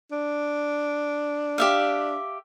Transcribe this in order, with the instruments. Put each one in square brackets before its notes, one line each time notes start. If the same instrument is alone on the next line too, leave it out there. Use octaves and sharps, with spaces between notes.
[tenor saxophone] D4
[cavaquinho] G4 E5 F5